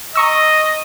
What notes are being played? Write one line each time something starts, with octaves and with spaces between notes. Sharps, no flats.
D#5 A#5 C#6 E6